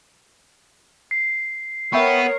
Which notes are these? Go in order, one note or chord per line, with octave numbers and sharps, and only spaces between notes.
C7
B3 A#4 C#5 E5 G5 C#6